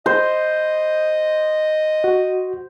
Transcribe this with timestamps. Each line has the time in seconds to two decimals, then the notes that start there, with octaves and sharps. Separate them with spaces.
0.06 C5 D#5
2.04 F#4